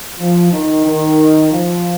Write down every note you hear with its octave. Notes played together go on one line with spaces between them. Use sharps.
F3
D#3
D#3
F3